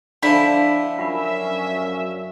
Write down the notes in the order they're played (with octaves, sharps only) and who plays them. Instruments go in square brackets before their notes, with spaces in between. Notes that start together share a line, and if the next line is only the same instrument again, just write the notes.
[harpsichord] D3 F3 [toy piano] D4 B5 [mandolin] E4
[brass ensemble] F#2 C#4 E5 [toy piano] F4 F#5 B5